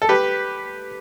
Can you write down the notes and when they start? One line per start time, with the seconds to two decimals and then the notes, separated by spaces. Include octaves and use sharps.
0.02 A4
0.09 G4 B4